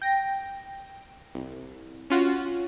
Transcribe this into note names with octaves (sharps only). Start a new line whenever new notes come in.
G5 A#6
C2
C#4 F4 F#4